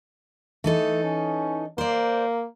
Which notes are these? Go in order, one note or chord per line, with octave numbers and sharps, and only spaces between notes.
E3 A3 D#4 A4
C#4
A#3 C5 D5